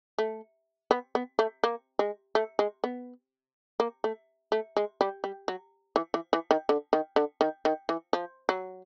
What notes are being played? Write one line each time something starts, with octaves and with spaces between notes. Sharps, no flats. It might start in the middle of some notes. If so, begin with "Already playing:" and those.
A3
B3
B3
A3
A#3
G#3
A3
G#3
B3
A#3
A3
A3
G#3
G3
G3
F#3
E3
E3
E3
D#3
D3
D#3
D3
D#3
D#3
E3
F3
F#3